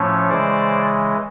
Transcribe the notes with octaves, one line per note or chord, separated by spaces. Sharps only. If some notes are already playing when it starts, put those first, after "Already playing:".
Already playing: A2 F3 A3 C#4
C#3 E3 G#3 C5 D5